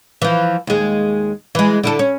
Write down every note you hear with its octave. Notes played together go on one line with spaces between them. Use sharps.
E3 F3
D#2 G#3
E3 G#3
D3 E4 A4
C#4